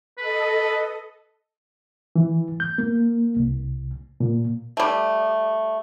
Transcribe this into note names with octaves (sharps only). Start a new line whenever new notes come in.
A4 B4 D#5
E3
G6
A#3
C2
A#2
G3 A3